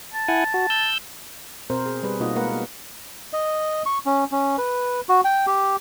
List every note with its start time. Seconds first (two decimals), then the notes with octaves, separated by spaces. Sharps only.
0.14 A5
0.28 E4 F#5 G#5
0.54 F#4
0.70 E6 G6
1.70 B2 C4 A#4 C5
1.86 G#4
2.03 G3 G#4 B4
2.20 B2 A#3 D#4 F4 F#4 D#5
2.35 G#3 A#3 A#4 B4 F#5
2.50 B3
3.33 D#5
3.86 C#6
4.06 C#4
4.32 C#4
4.58 B4
5.09 F#4
5.24 G5
5.47 G4